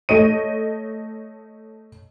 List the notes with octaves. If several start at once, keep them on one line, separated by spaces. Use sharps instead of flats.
A3 C#5 D#5 D#7